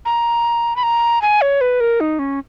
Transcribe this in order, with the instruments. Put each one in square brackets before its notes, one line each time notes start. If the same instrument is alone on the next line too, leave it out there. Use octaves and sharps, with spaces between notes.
[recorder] A#5
B5
A#5
G#5
C#5
B4
A#4
D#4
C#4